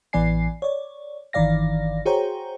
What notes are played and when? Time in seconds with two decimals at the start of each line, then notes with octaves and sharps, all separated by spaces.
0.13 A1 E3 B3 D5 G#5 C7
0.62 C#5 D5
1.33 G1 D#3 E3 D5 F5 A#6
2.06 F#4 G#4 C5 C#5 G5 A#5